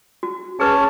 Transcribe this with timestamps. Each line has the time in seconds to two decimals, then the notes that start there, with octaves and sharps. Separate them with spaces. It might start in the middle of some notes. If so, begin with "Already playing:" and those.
0.23 F#4
0.60 C#4 G#4 B4 C#5 A5 D6